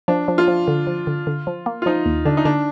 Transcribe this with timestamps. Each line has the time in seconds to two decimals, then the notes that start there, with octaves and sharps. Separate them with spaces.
0.08 F3 D4
0.28 F3
0.38 F4
0.48 F3
0.68 D3
0.87 F3
1.07 D3
1.27 D3
1.47 F3
1.66 A#3
1.82 F4
1.86 F3 D#4
2.06 D#2
2.25 D3 D4
2.37 D#4
2.45 D3 D4